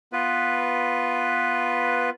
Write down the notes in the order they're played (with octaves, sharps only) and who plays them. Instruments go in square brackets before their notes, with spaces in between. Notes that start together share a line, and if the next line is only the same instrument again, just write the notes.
[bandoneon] B3 F4 B4